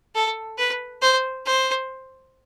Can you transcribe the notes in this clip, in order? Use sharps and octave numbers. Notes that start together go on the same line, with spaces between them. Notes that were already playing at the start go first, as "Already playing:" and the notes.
A4
B4
C5
C5